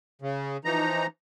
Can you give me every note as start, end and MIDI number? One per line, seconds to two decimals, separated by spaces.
0.22 0.57 49
0.65 1.06 52
0.65 1.06 53
0.65 1.06 63
0.65 1.06 82